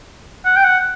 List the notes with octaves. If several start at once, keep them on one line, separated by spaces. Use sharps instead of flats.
F#5
G5
F#5